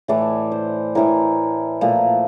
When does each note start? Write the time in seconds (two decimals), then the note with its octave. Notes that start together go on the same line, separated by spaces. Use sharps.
0.08 A2 E3 A3 D5
0.52 C5
0.95 A2 E3 A3 A#4
1.81 A#2 F3 A3